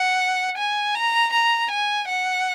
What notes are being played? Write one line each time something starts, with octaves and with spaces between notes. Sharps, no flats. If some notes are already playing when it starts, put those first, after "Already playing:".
Already playing: F#5
G#5
A#5
A#5
G#5
F#5